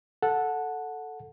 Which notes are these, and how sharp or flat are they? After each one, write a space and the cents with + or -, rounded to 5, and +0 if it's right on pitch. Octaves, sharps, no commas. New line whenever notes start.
A4 +0 F#5 -10